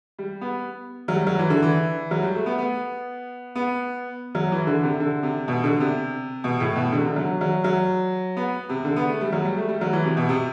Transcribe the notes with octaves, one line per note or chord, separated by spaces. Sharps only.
G3
B3
F#3
G3
F#3
E3
D3
E3
F#3
G3
A3
B3
B3
B3
F#3
E3
D3
C3
D3
C3
B2
D3
C3
B2
A2
B2
D3
C3
D3
F#3
F#3
F#3
B3
C3
D3
B3
A3
G3
F#3
G3
A3
G3
F#3
E3
C3
B2
C3